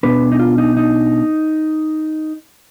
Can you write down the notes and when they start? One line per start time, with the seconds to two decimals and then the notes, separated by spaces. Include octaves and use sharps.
0.03 B2 B3 D4 B4
0.32 D#4
0.39 F4
0.58 D#4
0.77 D#4